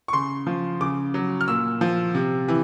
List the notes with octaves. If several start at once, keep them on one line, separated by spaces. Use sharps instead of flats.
C#6
C#3 C6
F3
C#3 D6
F#3
F6
A#2 E6
F3
C3
E3